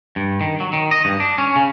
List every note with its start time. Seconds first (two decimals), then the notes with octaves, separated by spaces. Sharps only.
0.16 G2
0.41 D#3
0.60 F#3
0.73 D#3
0.91 D#5
1.05 G2
1.20 D4
1.38 C#4
1.56 C#3